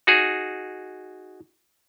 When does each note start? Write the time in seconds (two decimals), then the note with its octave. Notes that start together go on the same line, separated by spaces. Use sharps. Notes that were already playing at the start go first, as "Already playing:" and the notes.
0.07 D#4 F#4 G#4